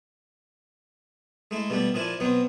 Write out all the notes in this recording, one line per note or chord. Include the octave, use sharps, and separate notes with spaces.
G#3 A3 E4
B2 G3 A3 D4
A#2 F3 D4 E4 G#5
B2 F#3 B3 C4